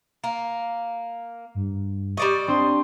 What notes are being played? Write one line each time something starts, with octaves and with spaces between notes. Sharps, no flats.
A#3
G2
G3 D5 D#5 C#6
C4 D4 C6